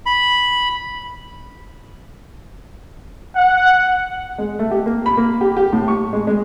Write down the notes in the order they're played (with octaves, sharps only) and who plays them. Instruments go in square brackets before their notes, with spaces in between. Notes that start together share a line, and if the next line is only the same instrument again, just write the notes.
[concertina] B5
[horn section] F#5
[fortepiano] G#3
A3
G4
A#3
B5
A#3
G4
G4
A2
C#6
G#3
G#3